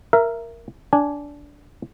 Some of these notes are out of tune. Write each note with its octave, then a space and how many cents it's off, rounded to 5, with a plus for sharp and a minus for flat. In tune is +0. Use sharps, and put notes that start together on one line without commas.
A#4 +0 E5 +25
D4 -15 G#5 +0